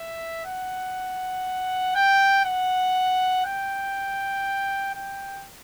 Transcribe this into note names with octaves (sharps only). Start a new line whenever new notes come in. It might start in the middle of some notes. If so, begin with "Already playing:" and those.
Already playing: E5
F#5
G5
F#5
G5
G5